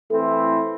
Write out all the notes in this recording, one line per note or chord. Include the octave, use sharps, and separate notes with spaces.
E3 A3 C4 E4 A4